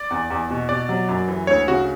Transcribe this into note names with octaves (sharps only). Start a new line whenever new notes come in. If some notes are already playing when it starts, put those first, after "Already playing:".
Already playing: D5
E2
E2
B2
B2 D5
F#3
F#2
E3
D2 C#5
C#3 F#4